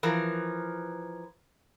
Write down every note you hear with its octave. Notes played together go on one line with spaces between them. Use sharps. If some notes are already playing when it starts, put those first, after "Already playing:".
E3 F3 A#4